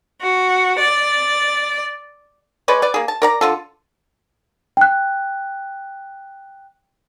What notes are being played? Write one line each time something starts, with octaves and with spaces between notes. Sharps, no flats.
F#4
D5
G#3 B4 C#5 D5
B4 D5
A#3 G#4
A5
A#4 D5 A#5
D3 F4 A4
G5 F#6